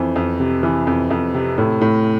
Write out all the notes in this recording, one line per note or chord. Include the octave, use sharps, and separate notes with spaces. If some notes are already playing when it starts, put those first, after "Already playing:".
Already playing: F2 E3 C5
F2
C3
E3
F2
F2
C3
A2
A2